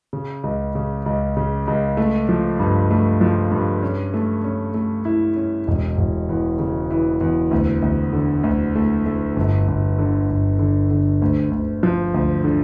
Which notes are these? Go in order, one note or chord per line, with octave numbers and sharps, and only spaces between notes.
C#3
C#2
C#3
C#2
C#3
C#2
A3
F3
G2
A3
F3
G2
C#4
A3
C#4
A3
E4
C#4
E1
E1
E2
C#3
E3
E2
D2
D2
D3
D2
A3
A3
G1
G1
D3
G1
D3
D3
D2
D2
F3
D2
D3